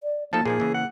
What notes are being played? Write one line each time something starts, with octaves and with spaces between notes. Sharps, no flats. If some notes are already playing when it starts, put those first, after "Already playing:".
D5
F3 A#3 D#4 A4 A5
A#2 F3 D#4 G#4
C#3 E3
F#5